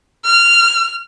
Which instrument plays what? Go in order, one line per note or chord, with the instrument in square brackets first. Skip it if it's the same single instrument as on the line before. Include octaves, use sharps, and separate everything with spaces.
[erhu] F6